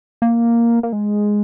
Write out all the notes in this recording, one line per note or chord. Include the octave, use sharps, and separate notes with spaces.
A#3
A#3
G#3